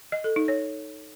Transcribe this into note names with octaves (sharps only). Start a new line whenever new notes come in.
D#5
A4
D#4
C#5